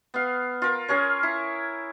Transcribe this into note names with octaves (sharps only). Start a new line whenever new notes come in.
B3 F5
F4 A#4
C#4 G#4 A#4 C#5
E4